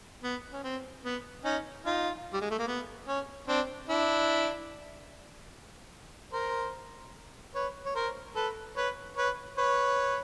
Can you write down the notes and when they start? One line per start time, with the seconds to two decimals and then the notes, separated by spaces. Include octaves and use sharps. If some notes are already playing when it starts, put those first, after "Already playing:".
0.23 B3
0.53 C#4
0.64 C4
1.04 B3
1.45 C#4 D#4
1.86 D#4 F4
2.33 G3
2.41 G#3
2.50 A3
2.59 A#3
2.67 B3
3.08 C#4
3.48 C4 D4
3.89 D4 E4
6.33 A#4 C5
7.55 B4 C#5
7.86 C#5
7.96 A#4 C5
8.36 A4 B4
8.76 B4 C#5
9.17 B4 C#5
9.58 B4 C#5